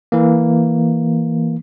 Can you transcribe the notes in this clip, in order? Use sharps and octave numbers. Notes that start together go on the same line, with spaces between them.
E3 A#3